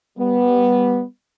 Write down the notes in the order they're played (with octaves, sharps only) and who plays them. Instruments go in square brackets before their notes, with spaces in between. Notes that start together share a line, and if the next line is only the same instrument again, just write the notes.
[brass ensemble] G3 B3